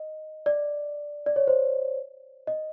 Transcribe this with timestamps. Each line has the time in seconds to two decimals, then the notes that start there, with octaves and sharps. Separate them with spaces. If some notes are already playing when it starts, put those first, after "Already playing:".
Already playing: D#5
0.46 D5
1.26 D5
1.36 C#5
1.48 C5
2.47 D#5